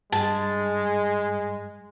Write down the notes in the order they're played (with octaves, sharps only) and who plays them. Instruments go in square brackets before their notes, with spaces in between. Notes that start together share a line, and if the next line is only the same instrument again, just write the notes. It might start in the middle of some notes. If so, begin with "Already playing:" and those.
[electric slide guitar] G2 [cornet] G#3 [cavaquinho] A5